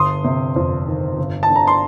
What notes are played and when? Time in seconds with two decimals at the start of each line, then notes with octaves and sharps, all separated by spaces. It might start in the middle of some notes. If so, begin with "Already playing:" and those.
Already playing: G1 C6 D#6
0.24 C3
0.56 F2
0.87 D#3
1.18 G1
1.43 A5
1.50 D3
1.56 A#5
1.67 C6